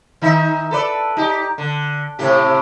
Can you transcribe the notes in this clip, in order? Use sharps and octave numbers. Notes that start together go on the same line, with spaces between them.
D#3 D#4 E5
A4 B4 D5
D#4 G4
D3
A2 C3 G4